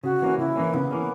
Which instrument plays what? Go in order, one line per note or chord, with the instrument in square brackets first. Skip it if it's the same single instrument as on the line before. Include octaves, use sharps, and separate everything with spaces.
[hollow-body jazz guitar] C#3 [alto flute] F#4
[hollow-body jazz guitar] E3 A#3 C#4
[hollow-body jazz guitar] C#3 [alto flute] E4
[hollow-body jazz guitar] E3 A#3 C#4
[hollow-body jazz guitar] C#3 [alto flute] B3
[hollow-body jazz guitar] E3 A#3 C#4